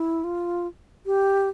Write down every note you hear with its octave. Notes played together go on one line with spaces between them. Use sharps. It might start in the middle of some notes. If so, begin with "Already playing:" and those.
Already playing: E4
F4
G4